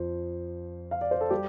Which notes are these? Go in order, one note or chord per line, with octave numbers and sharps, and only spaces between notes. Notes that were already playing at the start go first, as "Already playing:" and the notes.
Already playing: F2 F3 C5
F5
D5
C5
A4
G3 G4